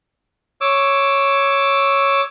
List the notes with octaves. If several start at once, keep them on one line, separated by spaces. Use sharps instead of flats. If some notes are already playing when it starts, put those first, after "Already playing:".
C#5 D6 E6